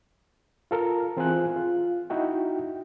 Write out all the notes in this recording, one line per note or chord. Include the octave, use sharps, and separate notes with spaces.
F4 A4 A#4 A#5
E3 C4 F4 G#4 G#5 F#6
F4
D#4 E4 F#4 G5